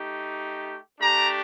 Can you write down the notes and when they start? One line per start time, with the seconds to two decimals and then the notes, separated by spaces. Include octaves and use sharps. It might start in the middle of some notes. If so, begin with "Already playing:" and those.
Already playing: A3 D#4 G4
1.00 A3 D4 G4 A#5